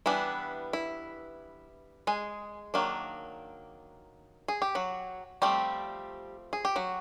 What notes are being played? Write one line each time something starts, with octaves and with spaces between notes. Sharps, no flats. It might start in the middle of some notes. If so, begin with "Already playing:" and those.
E3 G3 B3 D4 E4
E4
G#3 G#4
D#3 F#3 A#3 D4
G#4
G4
F#3 F#4
F3 G3 A3 C4 G4
G#4
G4
F#3 F#4